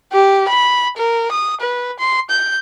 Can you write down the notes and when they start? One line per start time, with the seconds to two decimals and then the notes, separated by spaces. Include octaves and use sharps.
0.13 G4
0.48 B5
0.97 A#4
1.31 D#6
1.60 B4
1.99 C6
2.30 G6